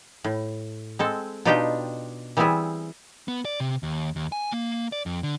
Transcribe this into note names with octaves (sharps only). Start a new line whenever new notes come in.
A2
G#3 C4 A4
B2 D4 D#4 F4 G4 G5
E3 G3 B3 C4 E4 G#4
B3
D5
C3
D#2
D#2
G#5
A#3
D5
F2
D3